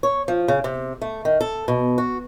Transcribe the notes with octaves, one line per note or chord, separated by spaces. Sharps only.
C#5
F3
C#3
C3
A3
D#3
A4
B2
F#4